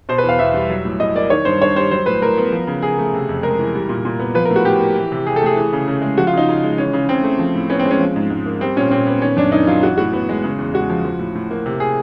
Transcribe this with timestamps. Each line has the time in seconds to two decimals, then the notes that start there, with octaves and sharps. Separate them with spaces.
0.09 B2 C5
0.18 B4
0.24 E2
0.29 F5
0.39 E2 E5
0.54 G3
0.70 F#3
0.85 A2
1.00 A2 D#5
1.15 A#3 D5
1.30 D#3 C#5
1.45 G2 C5
1.62 G2 C#5
1.76 G3 C5
1.91 F#3 C5
2.06 A2 B4
2.22 A2 A#4
2.37 B3
2.52 F3
2.67 C#3
2.82 C#3 G#4
2.99 A3
3.14 C3
3.29 F2
3.43 G#3 A#4
3.59 E3
3.75 G3
3.89 A#2
4.05 A#2
4.20 B3
4.35 F3 B4
4.45 A#4
4.50 A2
4.56 F#4
4.65 A2 G4
4.80 A#3
4.96 E3
5.12 C3
5.26 C3 G#4
5.36 A4
5.42 A3 G#4
5.56 E3
5.73 C#3
5.88 C#3
6.02 G#3
6.18 F3 F#4
6.27 F4
6.33 C#3 D#4
6.48 C#3
6.64 G#3
6.78 E3 C#4
6.93 C#3
7.09 C#3 C4
7.24 A3
7.39 F3
7.55 A2
7.70 B3 C#4
7.79 C4
7.85 G#3
7.91 C#4
8.00 F3
8.16 G#2
8.30 G#2
8.46 A#3
8.61 G3 C4
8.76 A#2 C#4
8.91 A#2 C4
9.07 B3
9.22 D#3 C#4
9.37 F#2 D4
9.52 A#3 D#4
9.67 F#3 F4
9.83 E3 F#4
9.98 A2 F#4
10.13 B3
10.29 G#3
10.44 C#3
10.58 E2
10.74 G#3 F#4
10.90 F3
11.05 F3
11.19 A2
11.35 A2
11.51 A#3
11.66 C3
11.80 G#4